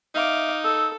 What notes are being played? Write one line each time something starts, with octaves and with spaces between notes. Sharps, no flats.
D#4 E5 F5 D6
A4 E6